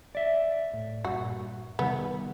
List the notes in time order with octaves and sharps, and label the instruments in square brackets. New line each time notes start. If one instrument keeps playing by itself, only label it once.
[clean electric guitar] D5 E5
[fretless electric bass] A2
[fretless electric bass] G2 A#2 [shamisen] F#4
[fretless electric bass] C3 D#3 G3 [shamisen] B3